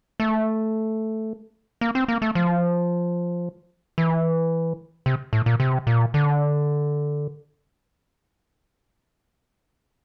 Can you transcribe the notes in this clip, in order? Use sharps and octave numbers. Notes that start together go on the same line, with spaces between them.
A3
A#3
C4
A#3
A3
F3
E3
C3
A2
A#2
C3
A#2
D3